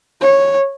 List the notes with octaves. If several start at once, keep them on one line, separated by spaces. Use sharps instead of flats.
C#5